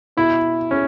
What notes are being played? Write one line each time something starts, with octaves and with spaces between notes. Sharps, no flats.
B2 E4
C#4